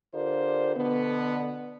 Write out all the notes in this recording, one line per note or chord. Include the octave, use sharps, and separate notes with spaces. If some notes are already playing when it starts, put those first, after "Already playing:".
D3 F4 G4 A#4 C5 D5
B2 D3 B3